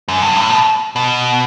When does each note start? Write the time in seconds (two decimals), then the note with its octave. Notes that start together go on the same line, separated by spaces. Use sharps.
0.08 F#2
0.22 G2
0.36 A2
0.50 B2
0.96 B2